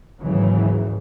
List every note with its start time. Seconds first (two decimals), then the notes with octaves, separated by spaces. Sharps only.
0.21 D#2 G#2 C#3 E3 F#3